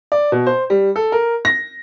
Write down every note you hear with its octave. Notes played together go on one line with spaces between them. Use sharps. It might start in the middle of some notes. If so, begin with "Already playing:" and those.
D5
B2
C5
G3
A4
A#4
A#6